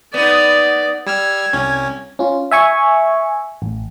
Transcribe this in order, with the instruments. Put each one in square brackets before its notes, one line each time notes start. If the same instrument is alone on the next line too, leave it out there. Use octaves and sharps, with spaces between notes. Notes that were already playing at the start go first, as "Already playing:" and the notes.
[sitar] B3 D#4 [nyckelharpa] D5
[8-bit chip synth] G3 E6 F6 [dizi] G#6
[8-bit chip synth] C2 C#4
[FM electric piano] C#4 F4
E5 G#5 C#6
A1